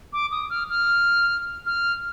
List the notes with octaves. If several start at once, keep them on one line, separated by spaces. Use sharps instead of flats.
D6
D#6
F6
F6
F6